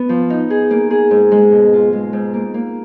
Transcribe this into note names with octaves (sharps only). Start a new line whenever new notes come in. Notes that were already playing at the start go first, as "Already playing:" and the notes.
Already playing: B3
F3
D#4
G#4
A#3
G#4
G#2
G#3
B2
F4
G#3
G#2
A#3
A#3